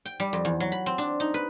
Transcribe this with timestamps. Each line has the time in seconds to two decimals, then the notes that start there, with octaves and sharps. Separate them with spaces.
0.06 G5
0.20 G3
0.33 F2
0.45 E2
0.60 F#3
0.72 B5
0.86 C4
0.98 D4
1.20 D#4
1.34 B4